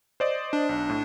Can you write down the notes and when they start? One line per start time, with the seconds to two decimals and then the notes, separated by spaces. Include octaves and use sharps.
0.20 C5 D5 D#5
0.53 D4
0.69 B1
0.90 A2